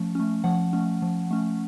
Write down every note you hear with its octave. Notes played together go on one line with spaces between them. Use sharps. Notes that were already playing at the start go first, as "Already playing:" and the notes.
Already playing: F3 A3 C#4
A3 C#4
F3 F#5
A3 C#4
F3
A3 C#4